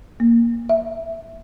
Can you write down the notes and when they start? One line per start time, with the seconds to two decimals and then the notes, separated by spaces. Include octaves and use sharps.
0.20 A#3
0.69 E5